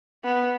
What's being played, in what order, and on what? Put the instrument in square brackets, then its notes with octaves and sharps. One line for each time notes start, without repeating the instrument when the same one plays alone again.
[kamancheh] B3